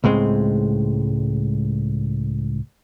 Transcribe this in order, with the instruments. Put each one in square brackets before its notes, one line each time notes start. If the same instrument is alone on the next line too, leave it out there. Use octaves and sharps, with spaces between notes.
[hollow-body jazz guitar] C#2 A2 G#3 C4